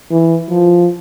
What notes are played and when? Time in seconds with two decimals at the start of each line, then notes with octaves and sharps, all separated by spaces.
0.11 E3
0.50 F3